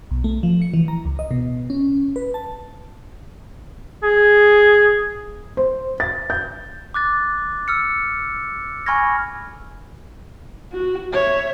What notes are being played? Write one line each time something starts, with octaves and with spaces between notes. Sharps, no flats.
B1
A3
F3
C#7
E3
A#5
C#2
D#5
B2
C#4
B4
A5
G#4
C5
A6
G6
D6 F#6 A6
E6 F6 C#7
G#5 B5 C#6 F6 G#6 A#6
F#4
C#5 E5